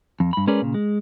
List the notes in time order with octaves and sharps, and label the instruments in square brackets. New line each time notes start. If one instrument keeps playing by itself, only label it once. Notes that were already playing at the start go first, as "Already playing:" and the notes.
[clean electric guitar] F2
G2 B5
G#3 C#4 G#4 A#4 B4 D5
A#2 C#3
G#3